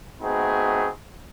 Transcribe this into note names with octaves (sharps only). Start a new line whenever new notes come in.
A3 B3 C4 D#4 F#4 G#4